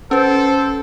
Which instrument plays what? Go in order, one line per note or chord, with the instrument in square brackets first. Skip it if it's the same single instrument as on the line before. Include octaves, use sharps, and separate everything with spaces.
[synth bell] C#4 B4 [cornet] A4 [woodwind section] C5